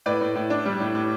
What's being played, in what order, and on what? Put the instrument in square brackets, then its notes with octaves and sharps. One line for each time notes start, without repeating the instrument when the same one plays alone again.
[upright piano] A2 B4 D5
A2
A2
D4
G3
A2
A2